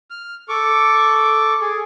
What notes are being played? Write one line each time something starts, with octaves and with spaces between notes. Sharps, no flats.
F6
A4 C#6 D6
G#4